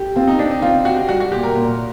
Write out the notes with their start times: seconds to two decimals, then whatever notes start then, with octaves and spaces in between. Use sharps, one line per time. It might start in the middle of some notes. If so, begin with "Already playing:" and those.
Already playing: G4
0.16 C4 F4
0.28 D#4
0.39 C4 D4
0.51 D#4
0.62 C4 F4
0.85 F#4 G4
1.09 G3 F#4
1.20 F#4
1.32 A#2 G4
1.43 A#4
1.55 A#2 A#4